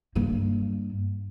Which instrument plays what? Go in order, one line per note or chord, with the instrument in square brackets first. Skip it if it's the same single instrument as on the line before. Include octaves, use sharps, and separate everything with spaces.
[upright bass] G2 A#3